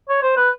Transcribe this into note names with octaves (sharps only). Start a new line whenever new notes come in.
C#5
C5
B4